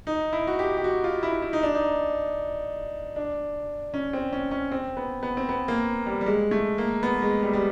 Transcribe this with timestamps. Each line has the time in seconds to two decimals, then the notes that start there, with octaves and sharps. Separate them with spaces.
0.07 D#4
0.33 E4
0.47 F#4
0.59 G4
0.77 G4
0.84 F#4
1.04 F4
1.23 E4
1.42 E4
1.53 D#4
1.63 D4
1.75 D#4
3.16 D4
3.94 C#4
4.13 C4
4.33 C#4
4.51 C#4
4.72 C4
4.97 B3
5.23 B3
5.37 C4
5.49 B3
5.68 A#3
6.06 G3
6.21 G3
6.26 G#3
6.51 A3
6.78 A#3
7.03 B3
7.22 G#3
7.42 G3
7.53 G3